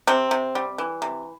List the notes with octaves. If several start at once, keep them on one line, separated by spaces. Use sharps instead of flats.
C3 C4
C3
G3
E3
C3